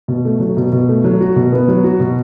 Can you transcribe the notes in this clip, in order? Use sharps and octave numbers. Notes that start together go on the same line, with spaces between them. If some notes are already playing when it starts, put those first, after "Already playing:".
B2
A3
F#3
B2
B2
A3
F#3
F#4
B2
B3
F#3
F#4
B2